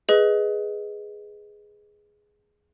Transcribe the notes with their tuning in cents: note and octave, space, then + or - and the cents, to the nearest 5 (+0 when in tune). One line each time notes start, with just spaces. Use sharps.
G#4 +0 B4 +0 D#5 +5